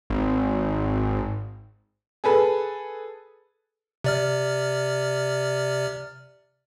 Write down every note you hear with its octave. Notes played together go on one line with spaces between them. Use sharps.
G#1
G#4 A4 B4
C3 D5 F6